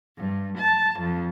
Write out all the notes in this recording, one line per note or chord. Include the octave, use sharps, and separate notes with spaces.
G2
A5
F2